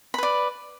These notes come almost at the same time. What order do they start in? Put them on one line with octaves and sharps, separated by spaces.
B5 B4 D5